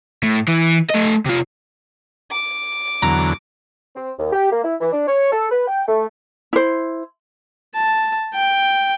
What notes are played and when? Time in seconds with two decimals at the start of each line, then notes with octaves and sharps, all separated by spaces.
0.23 A2
0.48 E3
0.90 A3 D#5
1.26 C3 F4
2.31 D6
3.02 E2 D3 F#3 A#5
3.95 C4
4.18 D#2
4.32 G4
4.51 A#3
4.63 E4
4.80 E3
4.92 D4
5.07 C#5
5.32 A4
5.50 B4
5.67 G5
5.87 A3
6.53 E4 C5
7.75 A5
8.34 G5